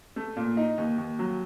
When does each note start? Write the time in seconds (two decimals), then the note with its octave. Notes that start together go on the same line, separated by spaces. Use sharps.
0.16 A3
0.36 A#2
0.57 D#4
0.78 D#2
0.98 D#2
1.19 F#3